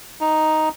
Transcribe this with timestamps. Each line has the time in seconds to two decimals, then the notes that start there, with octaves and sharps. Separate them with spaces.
0.21 D#4